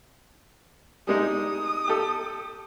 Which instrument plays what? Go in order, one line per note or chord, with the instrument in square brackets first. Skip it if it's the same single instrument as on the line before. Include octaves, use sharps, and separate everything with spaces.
[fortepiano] G3 G#3 D#4 [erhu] D#6
[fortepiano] G4 A4